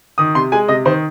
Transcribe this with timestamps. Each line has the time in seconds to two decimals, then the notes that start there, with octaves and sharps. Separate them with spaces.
0.18 D#3 D#6
0.35 C3 C6
0.52 G#3 G#5
0.68 C3 D#5
0.85 D#3 C5